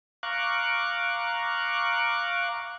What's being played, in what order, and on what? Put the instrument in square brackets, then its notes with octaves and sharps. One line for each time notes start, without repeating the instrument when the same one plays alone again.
[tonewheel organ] F5 A#5 C#6 D6 F#6